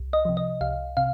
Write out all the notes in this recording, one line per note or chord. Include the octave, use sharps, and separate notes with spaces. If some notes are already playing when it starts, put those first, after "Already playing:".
Already playing: C2
D#5
C3 F3
D#5
C2 F5
C3 F5